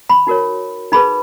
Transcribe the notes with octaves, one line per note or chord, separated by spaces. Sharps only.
B5
D#4 F#4 A#4 C#5
D#4 G#4 B4 B5